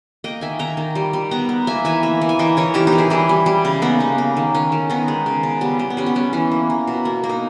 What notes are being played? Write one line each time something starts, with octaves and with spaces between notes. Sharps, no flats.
A#3 D#5 G5
D#3 E5 G#5
D#3 G5 A#5
D#3
G3
G3
B3 G5 A#5
B3
A#3 E5 G#5
E3 E5 G#5
A#3
E3
G#5
E3 D#5 G5
E3 A#4 C#5
E3 D#4 G4
D#4 G4
E3
E4 G#4
G3 E4 G#4
G3
G3
C#3
A#3 B3 D#4
A#3
A#3
D#3
D#3 C#4
D#3
D#3 B3 D#4
G#3
C#3
C#3
G3 B3
G3
B3
G3 C#4
B3
G3 C#4
E3 C#4
A#3
A#3
B2
A#3
A#3
D#4